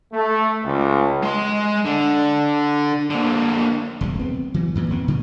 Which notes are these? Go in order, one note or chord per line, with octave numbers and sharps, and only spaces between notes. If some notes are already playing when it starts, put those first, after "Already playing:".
A3
C#2
G#3 C6
D3
D3 A#3
E1 C2 A#2 C#3
B3 C4
E3 F#3
F#2 A#2 E3
A#1 B3 C4
A#2 D3 G3